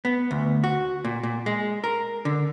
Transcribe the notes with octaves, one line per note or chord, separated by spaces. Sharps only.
B3
D2
F#4
A#2
A#2
G#3
A#4
D3